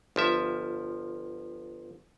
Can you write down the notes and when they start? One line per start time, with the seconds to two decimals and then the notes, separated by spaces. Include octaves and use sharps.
0.16 G1 F3 E5